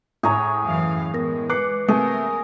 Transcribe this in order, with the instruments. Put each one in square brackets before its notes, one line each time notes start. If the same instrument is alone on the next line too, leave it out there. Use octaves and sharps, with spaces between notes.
[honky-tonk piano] A2 A#5 [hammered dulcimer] G#4 C#5
[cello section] F#2 E3 F5
[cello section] E3 G#3 [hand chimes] B3 A#4 A#6
[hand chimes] B4 C7 C#7 [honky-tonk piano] D6 F#6
[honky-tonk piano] C3 A3 [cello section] A#3 A#4 [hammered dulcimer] G#4